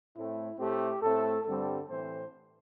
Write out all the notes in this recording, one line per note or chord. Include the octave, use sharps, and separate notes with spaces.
A2 A3 C4 E4
A2 A3 C4 G4
A2 A3 C4 A4
G2 D3 G3 C4 A4
A2 E3 A3 C4 C5